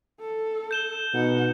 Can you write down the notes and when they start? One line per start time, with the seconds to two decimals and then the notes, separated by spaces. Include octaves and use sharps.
0.20 A4
0.71 G6 E7 G7
1.13 B2 D#4 F#5